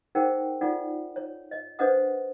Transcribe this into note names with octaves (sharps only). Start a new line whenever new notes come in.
D#4 G#4 A#4 C5 F#5 G5
D#4 F4 A4 D5 F#5
C#5
D#5
D4 B4 C5 D#5 F#5 D#6